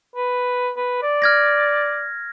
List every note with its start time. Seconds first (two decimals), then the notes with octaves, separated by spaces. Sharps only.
0.16 B4
0.77 B4
1.02 D5
1.22 F6 G#6 A#6